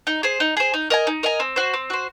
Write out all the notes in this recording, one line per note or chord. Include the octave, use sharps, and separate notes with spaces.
D#4
G#4 C5
D#4
G#4 C5
D#4
A#4 D#5 G#5
D#4
A#4 D#5 G#5
C4
F#4 C5
C4
F#4 C5